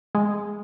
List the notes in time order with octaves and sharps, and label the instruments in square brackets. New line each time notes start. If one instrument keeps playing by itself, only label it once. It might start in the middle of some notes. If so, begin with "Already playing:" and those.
[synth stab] G#3